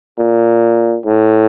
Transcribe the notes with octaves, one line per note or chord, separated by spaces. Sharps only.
A#2
A2